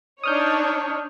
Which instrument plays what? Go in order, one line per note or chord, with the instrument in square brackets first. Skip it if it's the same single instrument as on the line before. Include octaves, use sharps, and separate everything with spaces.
[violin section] D4 D#4 C#5 [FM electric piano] D#6 F6 G6